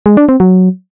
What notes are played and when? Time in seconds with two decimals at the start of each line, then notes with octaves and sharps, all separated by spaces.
0.06 G#3
0.17 D4
0.29 C4
0.40 F#3